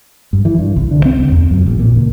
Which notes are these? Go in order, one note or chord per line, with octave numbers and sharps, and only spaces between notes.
G2
E3
G2
C2
D3
C4
C#2
E2
F#2
A1
A#2
C#2